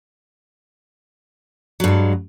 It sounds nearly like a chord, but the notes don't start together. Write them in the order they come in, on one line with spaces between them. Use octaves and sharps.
F#3 G2 G#3